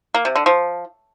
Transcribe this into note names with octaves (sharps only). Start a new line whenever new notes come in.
A#3
C3
D3
F3